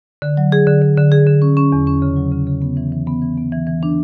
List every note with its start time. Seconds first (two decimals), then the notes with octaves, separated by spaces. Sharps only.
0.22 D3
0.37 F#3
0.52 G#4
0.67 D3
0.82 D3
0.97 D3
1.12 G#4
1.27 D3
1.42 C#4
1.57 C#4
1.72 E2
1.87 C#4
2.02 C#3
2.17 F#3
2.32 C#3
2.47 C#3
2.62 B3
2.77 E3
2.92 E3
3.07 B3
3.22 E3
3.37 B3
3.52 E3
3.67 E3
3.83 D4